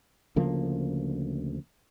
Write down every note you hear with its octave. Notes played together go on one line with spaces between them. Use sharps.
D2 C#3 F3 A#3